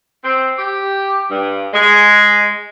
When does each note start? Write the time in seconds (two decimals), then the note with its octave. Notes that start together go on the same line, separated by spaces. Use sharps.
0.24 C4
0.59 G4
1.30 G2
1.74 G#3